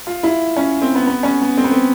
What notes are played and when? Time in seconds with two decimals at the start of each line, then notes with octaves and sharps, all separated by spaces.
0.07 F4
0.23 E4
0.57 C#4
0.82 C4
0.95 B3
1.07 B3
1.23 C#4
1.41 B3
1.57 C4
1.64 B3
1.71 C4